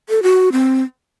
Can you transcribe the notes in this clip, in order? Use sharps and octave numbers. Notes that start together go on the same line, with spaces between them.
A4
F#4
C4